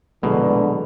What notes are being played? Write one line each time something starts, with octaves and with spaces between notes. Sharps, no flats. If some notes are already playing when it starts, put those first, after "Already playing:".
A#1 E2 B2 D3 F#3 G#3